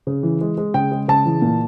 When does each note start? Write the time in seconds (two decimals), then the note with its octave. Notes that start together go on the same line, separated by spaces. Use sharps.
0.07 C#3
0.23 E3
0.41 G#3
0.58 G#3
0.74 C#3 G5
0.92 G#3
1.08 C#3 A5
1.25 E3
1.42 A#2